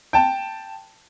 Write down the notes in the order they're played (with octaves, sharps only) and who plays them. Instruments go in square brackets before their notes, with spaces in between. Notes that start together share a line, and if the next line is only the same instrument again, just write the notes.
[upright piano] G5 A5